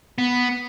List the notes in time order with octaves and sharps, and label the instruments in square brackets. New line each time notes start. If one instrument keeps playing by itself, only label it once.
[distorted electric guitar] B3